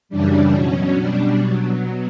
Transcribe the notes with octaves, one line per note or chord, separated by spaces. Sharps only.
F#2 C#3 E3 G3 D4
B2 F#3 C#4
B2 G3 D4
B2 F#3